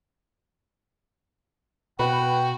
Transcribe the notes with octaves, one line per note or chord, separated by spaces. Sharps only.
B2 F#4 B4 G5